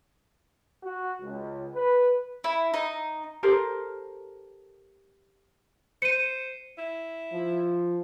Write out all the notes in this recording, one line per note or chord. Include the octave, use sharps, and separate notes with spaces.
F#4
C#2
B4
E4
D#4
G4 A4 A#4 C5
C5 C#7 D#7
E4
F3